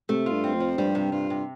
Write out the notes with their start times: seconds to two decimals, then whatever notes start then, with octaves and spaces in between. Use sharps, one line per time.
0.09 C3 A3
0.26 F4
0.31 G2
0.44 C4
0.55 F2
0.60 F3
0.78 G2 G3
0.95 C3
1.12 G2 F4
1.30 C3